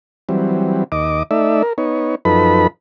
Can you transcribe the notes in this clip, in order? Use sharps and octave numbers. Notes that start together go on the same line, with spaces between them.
E3 F#3 G3 C4
D#2 D#5 D6
A3 D#4 D5 E5
A#4
B3 D#4 C#5
F#2 F3 D#4 A4 B4 B5